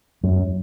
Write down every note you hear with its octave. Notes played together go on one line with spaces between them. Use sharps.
F#2